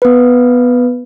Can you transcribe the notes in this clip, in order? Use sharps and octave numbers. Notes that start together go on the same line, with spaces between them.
B3 B4